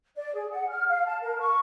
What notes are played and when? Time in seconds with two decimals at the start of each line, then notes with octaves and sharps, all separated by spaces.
0.16 D5
0.34 G#4
0.51 F#5
0.69 F6
0.87 F5
1.06 A5
1.21 A#4
1.39 C#6